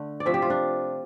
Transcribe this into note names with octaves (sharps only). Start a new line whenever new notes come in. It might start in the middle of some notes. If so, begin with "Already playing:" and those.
Already playing: D3 A3
D5
C3 F3 A3 E5
G4
F4
D4